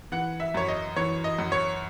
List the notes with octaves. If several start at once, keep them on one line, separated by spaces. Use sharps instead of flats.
E3 F#5
E5
F#2 C#5
D#5
E3 C#5
D#5
F#2
C#5